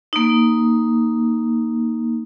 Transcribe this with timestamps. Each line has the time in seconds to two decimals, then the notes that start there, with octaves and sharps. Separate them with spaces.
0.13 A#3 D#4